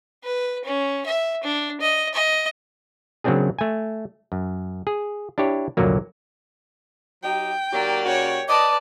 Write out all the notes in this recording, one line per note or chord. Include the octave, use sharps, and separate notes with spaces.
B4
C#4
E5
D4
D#5
D#5
C#3 F#3 A#3 C4 D4 G#4
A3 G#5
F#2
G#4
D4 E4 G4 C#5
C2 F2 A#2 D3 F#3 A#3
F#3 D#4 G4 G5
D#2 F#3 A#3 G4 D5
C#3 F#4 G4 C#5
B4 D5 D#5 A5 D6